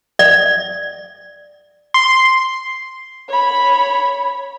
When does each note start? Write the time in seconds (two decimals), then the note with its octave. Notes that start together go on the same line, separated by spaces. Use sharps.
0.19 D5
1.94 C6
3.29 C#5 B5